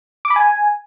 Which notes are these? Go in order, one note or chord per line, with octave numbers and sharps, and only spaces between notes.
D6
B5
G#5